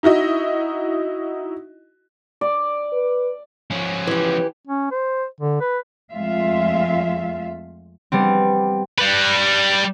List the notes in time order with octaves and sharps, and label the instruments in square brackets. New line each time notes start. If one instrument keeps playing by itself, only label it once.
[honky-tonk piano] D#4 E4 F#4 D#5
[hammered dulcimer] D5
[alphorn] B4
[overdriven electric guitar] F3 C#4
[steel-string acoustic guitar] E3 G4
[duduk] C#4
C5
D3
B4
[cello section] F2 G#3 A3 F4 E5 F5
[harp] G3 B3 C4
[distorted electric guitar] G3 B4